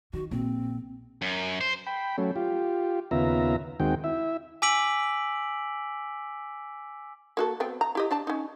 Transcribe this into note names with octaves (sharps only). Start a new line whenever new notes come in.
D#3 F#4
A#1 C4
F#2
C5
G5 B5
F#3 A3 C#4
F4 G4
D#2 C#3 B3 F4 E5 A#5
D#2 D#3 G#3 C4 F#4 G5
E4 E5
G#5 D6 E6 B6 D7 F#7
A#3 F#4 A4
B3 C4 G5
A#5
E4 G4 D#5
D4 D5 A5
C#4 D#4